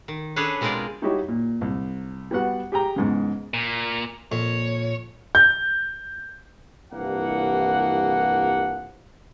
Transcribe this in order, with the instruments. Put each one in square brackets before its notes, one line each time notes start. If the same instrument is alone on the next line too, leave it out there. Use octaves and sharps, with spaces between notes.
[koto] D#3
C#4 D4 G#4 A4 B4 C#5
B2 G#3 C4 F4 A#4 D5
[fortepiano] G3 D#4 E4 F#4 G4 C#5
A#2
C2
G3 B3 F#4 F#5
G4 G#4 G5 A#5
E2 G#2 C#3
[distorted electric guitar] A#2
[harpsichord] F2 [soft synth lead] A#2 [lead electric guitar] C#5
[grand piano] G6
[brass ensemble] C2 G2 E3 F3 A#3 F#5